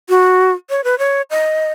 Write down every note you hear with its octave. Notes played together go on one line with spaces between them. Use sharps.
F#4
C#5
B4
C#5
D#5